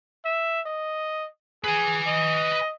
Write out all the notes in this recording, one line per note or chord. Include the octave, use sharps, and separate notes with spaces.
E5
D#5
G#4 B4 G#5
D#5